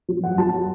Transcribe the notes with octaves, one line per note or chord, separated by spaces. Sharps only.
F#3
F#2 F#5
F#3 A5